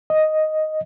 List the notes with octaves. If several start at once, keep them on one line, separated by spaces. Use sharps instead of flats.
D#5